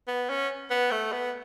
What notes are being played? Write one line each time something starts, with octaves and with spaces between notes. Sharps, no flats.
B3
C#4
B3
A3
B3